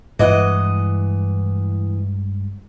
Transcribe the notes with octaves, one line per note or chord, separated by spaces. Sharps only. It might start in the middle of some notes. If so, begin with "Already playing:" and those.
G2 E3 G#3 D#5 F#5